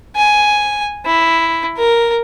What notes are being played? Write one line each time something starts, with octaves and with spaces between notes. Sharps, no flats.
G#5
E4
A#4